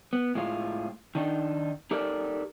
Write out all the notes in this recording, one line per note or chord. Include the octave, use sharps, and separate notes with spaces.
B3
A2 G#3 F4
D#3 D4 D#4
D#4 G4 A4 A#4 D5